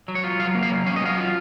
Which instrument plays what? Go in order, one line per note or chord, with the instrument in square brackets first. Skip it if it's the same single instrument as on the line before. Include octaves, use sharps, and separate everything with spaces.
[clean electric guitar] F#3
C#5
F4
F#3 F5
A#3
F5
F#3
C#4 F5
D#5
F#3 F5
F4